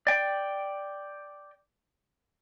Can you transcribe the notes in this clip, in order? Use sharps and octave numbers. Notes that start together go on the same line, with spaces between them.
D5 G5